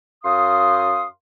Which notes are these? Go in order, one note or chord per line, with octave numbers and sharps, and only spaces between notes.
F#2 F5 C6 D#6